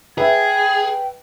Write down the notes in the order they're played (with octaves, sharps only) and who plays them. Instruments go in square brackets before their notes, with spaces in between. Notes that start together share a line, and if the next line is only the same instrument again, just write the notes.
[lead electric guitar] G#4 [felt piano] B4 E5 [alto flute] G5 [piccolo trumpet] G#6